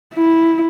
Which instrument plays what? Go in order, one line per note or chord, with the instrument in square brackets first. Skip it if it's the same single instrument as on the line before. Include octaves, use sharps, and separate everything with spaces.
[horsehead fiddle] E4